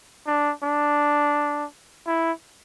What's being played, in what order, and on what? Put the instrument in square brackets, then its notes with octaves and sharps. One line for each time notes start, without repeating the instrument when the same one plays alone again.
[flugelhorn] D4
D4
E4